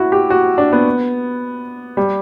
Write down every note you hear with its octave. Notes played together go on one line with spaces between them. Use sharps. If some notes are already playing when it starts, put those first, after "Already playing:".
Already playing: E4 F#4
G4
F#4
D4
B3
G3